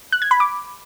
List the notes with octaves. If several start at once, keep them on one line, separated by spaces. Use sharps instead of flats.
F#6
G#6
B5
D6